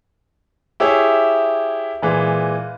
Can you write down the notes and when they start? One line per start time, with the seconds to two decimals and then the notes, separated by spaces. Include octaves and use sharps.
0.80 E4 G4 G#4 C#5 E5
2.02 A#2 E3 G#3